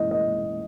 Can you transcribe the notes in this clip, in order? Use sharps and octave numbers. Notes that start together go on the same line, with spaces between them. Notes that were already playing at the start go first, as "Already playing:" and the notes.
Already playing: F#2 E3 G#3 D#5
D#5